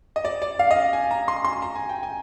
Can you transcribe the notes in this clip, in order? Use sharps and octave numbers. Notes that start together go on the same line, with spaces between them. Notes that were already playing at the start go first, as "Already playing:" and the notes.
D#5
D5
D5
F5
D#5
F5
G#5
A#5
C6
C6
A#5
G#5
G5
G#5